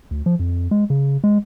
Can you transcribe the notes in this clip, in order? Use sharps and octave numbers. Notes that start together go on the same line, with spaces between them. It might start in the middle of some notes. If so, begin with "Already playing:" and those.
D2
F3
F2
G#3
C#3
G#3